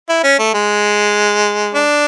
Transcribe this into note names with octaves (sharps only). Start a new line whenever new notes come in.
E4
C#4
A3
G#3
D4